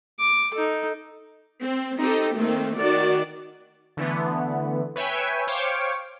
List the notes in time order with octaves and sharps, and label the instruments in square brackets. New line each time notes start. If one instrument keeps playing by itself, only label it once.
[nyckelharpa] D6
D#4 A4
[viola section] C4
C4 D#4 G4 A4
D#3 A3 A#3 C4
D#3 F#4 D5
[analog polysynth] D3 E3 A3 B3
B4 C#5 E5 G5 G#5
C5 C#5 F5 G5 C#6 D6